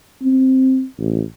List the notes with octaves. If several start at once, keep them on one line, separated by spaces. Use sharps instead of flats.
C4
A1